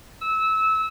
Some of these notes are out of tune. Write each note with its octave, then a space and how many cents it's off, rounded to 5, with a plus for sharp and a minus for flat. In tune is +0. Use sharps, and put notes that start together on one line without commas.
E6 -20